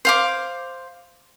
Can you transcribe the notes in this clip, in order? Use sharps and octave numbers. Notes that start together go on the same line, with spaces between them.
C5 F5 D6